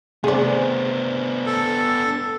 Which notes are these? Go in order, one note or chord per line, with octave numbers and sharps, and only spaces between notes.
C3 A3 B3 D4 G#4 C5 D5
A4